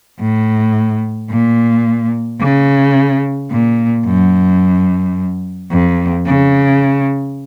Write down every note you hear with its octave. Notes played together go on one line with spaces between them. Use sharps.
A2
A#2
C#3
A#2
F#2
F2
C#3